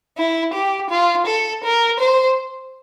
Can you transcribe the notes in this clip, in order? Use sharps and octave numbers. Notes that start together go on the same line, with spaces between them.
E4
G4
F4
A4
A#4
C5